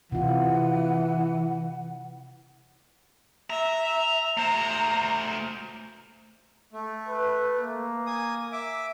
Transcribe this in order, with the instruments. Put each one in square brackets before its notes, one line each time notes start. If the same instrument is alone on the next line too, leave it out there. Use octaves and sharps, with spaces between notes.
[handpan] C3 F4 [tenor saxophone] E3 [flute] F#5
[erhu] E5 [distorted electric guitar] A#5
[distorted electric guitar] A3 C5 [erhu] A#5
[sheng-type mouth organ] A3
[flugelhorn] B4
A#3
[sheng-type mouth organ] G#5 D#6
E5 D6